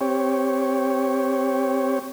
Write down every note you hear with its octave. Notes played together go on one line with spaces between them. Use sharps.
C4 G4 C#5